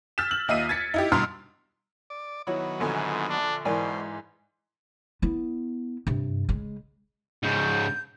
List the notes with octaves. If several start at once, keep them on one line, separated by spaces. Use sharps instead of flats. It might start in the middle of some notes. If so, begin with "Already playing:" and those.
E6 F6 G6 A6 B6 E7
F#7
D#2 F4 D#5 E5 C7 D#7
G#6 A6 B6 C#7
D#4 E4 G4
G2 B2 A#5 C6 E6 F6
D5
D#3 F#3 B3 E4 F#4 C#5
A#1 G#2 D3 G#5
D4
G#2 B2 E3 A#4 C5 D5 G#5
B3 E4
G2 C3
C#3 G#3
G#2 C#3 G6